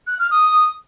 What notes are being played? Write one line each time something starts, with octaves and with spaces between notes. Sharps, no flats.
F#6
F6
D#6